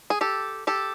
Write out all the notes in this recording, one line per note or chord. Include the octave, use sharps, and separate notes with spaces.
G#4
G4 A4
G4 A4